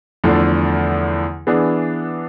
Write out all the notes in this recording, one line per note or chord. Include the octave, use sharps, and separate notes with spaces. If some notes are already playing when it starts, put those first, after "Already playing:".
E2 D3 F3 A3
E3 B3 D4 G#4